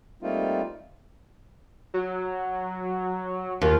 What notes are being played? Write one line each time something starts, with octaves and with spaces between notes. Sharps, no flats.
G3 A3 A#3 C4 D#4 F4
F#3
D#2 F4